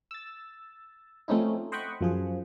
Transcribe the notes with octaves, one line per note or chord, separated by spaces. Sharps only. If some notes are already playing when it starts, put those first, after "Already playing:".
E6 A6
F3 A3 C4 C#4 D#4 E4
C5 D#5 F#5 G5 B5 C#6
F#2 F3 G#4